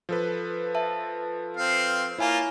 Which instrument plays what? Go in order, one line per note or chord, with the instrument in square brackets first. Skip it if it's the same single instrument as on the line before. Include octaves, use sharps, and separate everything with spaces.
[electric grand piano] F3 A4 B4
[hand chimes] E5 A5
[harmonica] C4 F5
[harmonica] A#3 F4 [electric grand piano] E4 [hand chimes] C#5 G#5 A#5